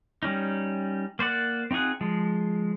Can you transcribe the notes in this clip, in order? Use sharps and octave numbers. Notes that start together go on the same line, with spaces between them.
G3 C#4 D#4
A#3 C5 D5 F#5
C4 D#4 F4 G#4 F#5
F3 G#3